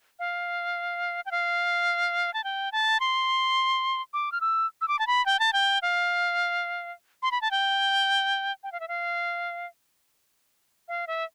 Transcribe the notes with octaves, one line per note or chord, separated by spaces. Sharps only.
F5
G5
F5
A5
G5
A5
C6
D6
F6
E6
E6
D6
A5
B5
G5
A5
G5
F5
C6
B5
A5
G5
G5
F5
E5
F5
F5
E5